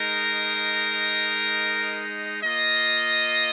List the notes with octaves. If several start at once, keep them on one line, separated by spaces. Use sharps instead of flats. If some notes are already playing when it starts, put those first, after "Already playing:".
Already playing: G#3 D#4 A#4
A#3 F4 D#5